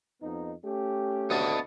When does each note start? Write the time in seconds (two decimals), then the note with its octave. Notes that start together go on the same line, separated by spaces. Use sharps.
0.22 F2 B3 D#4
0.65 A3 C#4 G4
1.30 D2 B3 D#5 A5